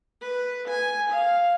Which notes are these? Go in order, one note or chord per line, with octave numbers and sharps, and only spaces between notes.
B4
G#5
F5